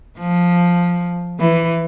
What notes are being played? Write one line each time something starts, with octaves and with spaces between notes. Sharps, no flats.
F3
E3